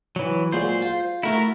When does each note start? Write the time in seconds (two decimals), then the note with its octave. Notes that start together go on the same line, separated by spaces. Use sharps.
0.16 E3 F#3
0.52 A#2 F#3 G#3 C5
0.82 F4
1.23 A3 E4 F#4 A#4